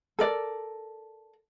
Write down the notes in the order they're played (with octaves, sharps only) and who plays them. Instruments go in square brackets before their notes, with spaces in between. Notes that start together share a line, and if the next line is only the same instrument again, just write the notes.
[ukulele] A4 A#4 D5